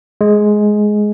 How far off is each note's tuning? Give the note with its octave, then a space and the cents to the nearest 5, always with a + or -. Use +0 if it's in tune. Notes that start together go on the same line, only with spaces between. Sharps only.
G#3 +10